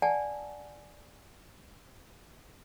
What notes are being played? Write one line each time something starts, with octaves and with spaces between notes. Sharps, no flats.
D5 F#5 G#5 A5